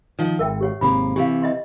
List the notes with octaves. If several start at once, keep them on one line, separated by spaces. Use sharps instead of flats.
D#3 F3
G#1 A#4 E5 G5
G4 C#5 F#5
G#1 C3 A#3 B5
C3 E3 G4 F5
D#5 E5 C6